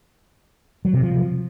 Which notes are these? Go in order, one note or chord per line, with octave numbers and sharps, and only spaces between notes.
F#3
C3
F3